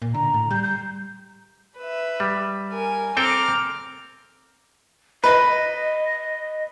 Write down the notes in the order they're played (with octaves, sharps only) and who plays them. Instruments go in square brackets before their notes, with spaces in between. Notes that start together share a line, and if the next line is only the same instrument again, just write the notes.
[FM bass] A#2
[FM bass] D3 [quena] A#5
[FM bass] A2
[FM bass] G3 [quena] G6
[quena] G6
[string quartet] B4 E5
[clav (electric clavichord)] G3
[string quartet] A#4 G#5
[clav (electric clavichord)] C4 A4 G5 [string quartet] A#5 D6 F6
[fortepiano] B4 [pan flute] D#5